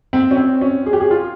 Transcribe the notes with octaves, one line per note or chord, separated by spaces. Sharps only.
C4
C#4
C4
C#4
G#4
G4
G#4
F4